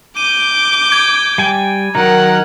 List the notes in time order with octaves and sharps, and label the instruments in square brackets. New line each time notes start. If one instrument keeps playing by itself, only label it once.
[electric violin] D6 G6 [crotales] D#7
[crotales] G#6
[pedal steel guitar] G3 G5 G#5
[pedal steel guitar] D#3 F#3 D#4 [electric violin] A#4 F#5